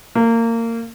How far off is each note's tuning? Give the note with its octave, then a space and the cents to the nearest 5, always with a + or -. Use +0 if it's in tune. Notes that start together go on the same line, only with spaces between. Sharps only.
A#3 -25